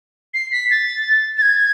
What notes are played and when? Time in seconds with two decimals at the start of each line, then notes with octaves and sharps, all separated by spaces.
0.34 C7
0.52 B6
0.71 A6
1.38 A6
1.42 G#6